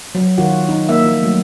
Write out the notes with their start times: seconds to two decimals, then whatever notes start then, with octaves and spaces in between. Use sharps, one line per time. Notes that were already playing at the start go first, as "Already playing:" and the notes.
0.15 F#3
0.38 D#3 F4 F#4
0.69 D#4
0.89 A#3 E5
1.05 F3
1.23 F#3 A3